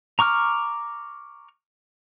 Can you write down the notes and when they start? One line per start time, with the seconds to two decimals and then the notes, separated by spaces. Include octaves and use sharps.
0.19 A#5 C#6 D6 F6